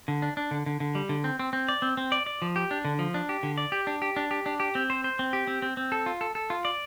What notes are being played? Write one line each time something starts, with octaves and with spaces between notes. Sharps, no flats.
D3
D4
D4
D3
D3
D3
G3
D3
C4
C4
C4
D5
C4
C4
D5
D5
F3
G4
D4
D3
F3
D4
G4
D3
D5
G4
D4
G4
D4
G4
D4
G4
C4
C5
C5
C4
G4
C4
C4
C4
A4
F4
A4
A4
F4
D5